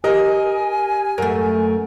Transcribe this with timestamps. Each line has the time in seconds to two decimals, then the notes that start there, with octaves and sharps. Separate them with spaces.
0.04 G4 A#4 D#5 G#5
1.18 F#2 A3 A#4